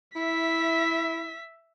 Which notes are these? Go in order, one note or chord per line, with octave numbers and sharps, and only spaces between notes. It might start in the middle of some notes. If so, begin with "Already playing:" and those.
E4 E5 B6